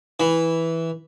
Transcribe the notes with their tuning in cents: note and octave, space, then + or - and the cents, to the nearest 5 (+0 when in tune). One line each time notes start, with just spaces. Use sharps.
E3 -5 B5 +0